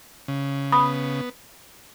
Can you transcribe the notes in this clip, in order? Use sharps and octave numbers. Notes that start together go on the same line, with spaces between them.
C#3
B3 B5 D#6